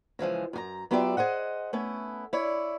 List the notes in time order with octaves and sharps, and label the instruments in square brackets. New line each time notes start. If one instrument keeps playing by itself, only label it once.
[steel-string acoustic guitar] C#3 E3 F3 G#3
F#2 G4 A#5
F#3 B3 F4 G4 D5 E5
G#4 C5 D#5 F#5
A3 B3 C#4 E4
E4 C#5 D5